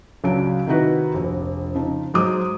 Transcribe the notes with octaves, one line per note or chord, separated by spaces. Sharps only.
C#2 F#3 D4 C#5 D7
C3 D#3 D#4 E4 F#4 B4
F1 A#1
C#3 F3 D#4
G#2 F#3 G#3 C5 D6 D#6